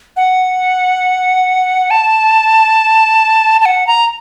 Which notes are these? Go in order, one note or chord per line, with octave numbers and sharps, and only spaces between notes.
F#5
A5
A5
F#5
A#5